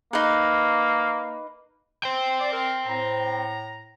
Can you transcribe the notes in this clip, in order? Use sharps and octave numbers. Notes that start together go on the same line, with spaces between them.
A#3 D#4 B4
C5 G5
D5
A#4
A2 A#5